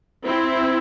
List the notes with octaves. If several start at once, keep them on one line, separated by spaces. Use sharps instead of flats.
C4 E4